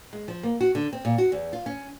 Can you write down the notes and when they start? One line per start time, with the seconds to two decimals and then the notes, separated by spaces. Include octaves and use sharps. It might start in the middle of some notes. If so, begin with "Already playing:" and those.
0.13 G#3
0.28 F3
0.43 A#3
0.61 F#4
0.75 D3
0.93 C4
1.05 A#2
1.18 F#4
1.32 E2
1.53 F4
1.66 C#4